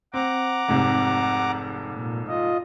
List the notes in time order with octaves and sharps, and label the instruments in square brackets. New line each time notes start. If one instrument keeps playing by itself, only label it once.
[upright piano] C4 [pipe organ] F#5 A#5 D6
[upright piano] F1 G#2 C3
[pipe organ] A#2
F4 D#5